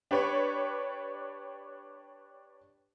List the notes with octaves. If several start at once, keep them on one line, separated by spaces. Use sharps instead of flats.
D4 G4 B4 C#5 D5